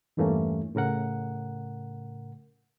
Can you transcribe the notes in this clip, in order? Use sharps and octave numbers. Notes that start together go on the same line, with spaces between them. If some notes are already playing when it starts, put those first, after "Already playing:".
E2 G2 E3 A3 A#3 C#4
A2 C#3 A#4 F#5